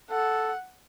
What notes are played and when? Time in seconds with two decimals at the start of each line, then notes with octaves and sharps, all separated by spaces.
0.10 A4 F#5